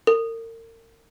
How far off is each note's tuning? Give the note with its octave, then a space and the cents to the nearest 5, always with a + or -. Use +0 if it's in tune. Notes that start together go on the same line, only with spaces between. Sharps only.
A#4 -40